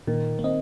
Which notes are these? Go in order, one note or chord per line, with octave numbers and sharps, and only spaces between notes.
A#2 D#3
A#3
C4 D#5